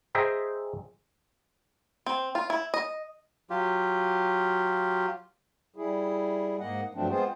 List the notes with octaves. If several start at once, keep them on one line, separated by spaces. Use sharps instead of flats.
G#4 C5 D#5 E5 G5 A#5
C4
F4
E4
D#5
F#3 F4 G4
G3 E4 G#4
G#2 A#3 D#5 F#5
G2 F3 F#3 A3 C4 D4
G#3 B3 C4 F4 G#4 C5